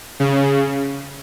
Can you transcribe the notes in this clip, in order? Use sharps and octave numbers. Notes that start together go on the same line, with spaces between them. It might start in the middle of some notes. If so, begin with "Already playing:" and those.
C#3